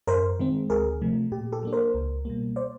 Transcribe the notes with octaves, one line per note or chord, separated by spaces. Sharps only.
F#2 A#4 C5
D#3 G#3 C4
D2 G#4 A#4
C3 F3 A3
A#2 G4
G4 A4
F#3 A#3 D4
A#4 C5
C#2
B2 G3 A#3
C5 D5